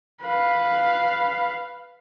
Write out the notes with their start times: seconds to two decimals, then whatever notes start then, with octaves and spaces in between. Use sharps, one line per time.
0.23 B4 F5